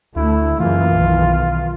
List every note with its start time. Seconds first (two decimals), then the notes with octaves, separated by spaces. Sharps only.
0.16 D2 A3 E4
0.60 F#2 C#3 E3 A#3 F4
0.89 B1 D#3